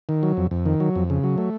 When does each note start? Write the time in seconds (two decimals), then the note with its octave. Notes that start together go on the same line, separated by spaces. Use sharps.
0.09 D#3
0.23 F#3
0.37 F2
0.51 F2
0.66 D#3
0.80 F#3
0.95 F2
1.10 C#3
1.24 F#3
1.38 A3